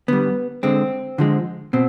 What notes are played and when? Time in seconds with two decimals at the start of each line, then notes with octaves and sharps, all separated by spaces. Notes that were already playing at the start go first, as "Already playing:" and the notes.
0.08 D3 G3 B3
0.63 D3 G#3 C4
1.18 D3 F3 G#3
1.73 B2 C4